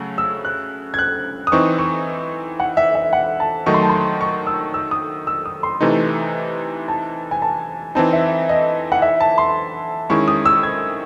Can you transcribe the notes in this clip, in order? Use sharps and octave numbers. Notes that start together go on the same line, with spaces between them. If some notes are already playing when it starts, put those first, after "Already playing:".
Already playing: C#3 F#3 A3
E6
F#6
G#6
F#6
D#6
E3 C4 D#4 C#6
C#6
F#5
E5
E5
F#5
A5
D#3 F#3 A3 D#4 C#6
C6
A5
C6
C#6
E6
E6
D#6
E6
D#6
C6
C3 E3 A3 D#4
A5
G#5
A5
E3 C4 D#4 A5
E5
D#5
F#5
E5
A5
C6
D#3 G#3 C#4 E4 C#6
D#6
E6
G#6